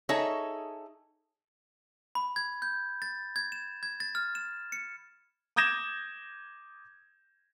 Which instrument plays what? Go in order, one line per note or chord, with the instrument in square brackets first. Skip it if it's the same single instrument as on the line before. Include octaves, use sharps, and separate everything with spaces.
[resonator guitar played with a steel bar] D#4 G#4 A4 C#5 E5
[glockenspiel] B5
G#6
G6
A6
G#6
E7
G#6
A6
F6
E7
C#7
[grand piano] D6 D#6 G6 G#6 A#6 E7